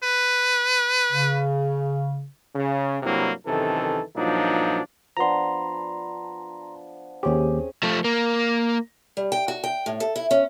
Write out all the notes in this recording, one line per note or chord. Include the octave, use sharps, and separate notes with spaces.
B4
C#3
C#3
G2 C3 F#3 A#3 E4
F#2 C3 D#3 E3 A4
G2 A#2 F3 F#3 D4 D#4
F3 B3 D4 A#5 C6
D#2 C4 C#4 G4 G#4
F3 A3
A#3
G3
G5
F#4
G5
A2
A4
E4
C#4